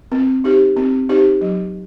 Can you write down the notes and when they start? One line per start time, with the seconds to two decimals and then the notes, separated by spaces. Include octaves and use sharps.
0.12 C4
0.44 D#4 G4 C5
0.76 C4
1.09 D#4 G4 C5
1.41 F#3